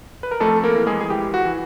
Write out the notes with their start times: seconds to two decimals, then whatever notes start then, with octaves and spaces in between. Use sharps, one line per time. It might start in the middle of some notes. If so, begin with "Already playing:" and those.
0.23 B4
0.31 A#4
0.40 F2 A3 A4
0.64 A#3 A#4
0.75 E3
0.87 G#3 G#4
1.01 G#4
1.10 E3 G4
1.34 F#4
1.45 E3